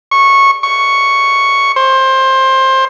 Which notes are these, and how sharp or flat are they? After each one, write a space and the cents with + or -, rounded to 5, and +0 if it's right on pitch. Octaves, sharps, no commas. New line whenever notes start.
C#6 -15
C#6 +0
C5 +20